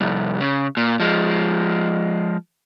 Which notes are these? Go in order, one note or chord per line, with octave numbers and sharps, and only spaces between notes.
C2 F2
C#3
A#2
F3 G#3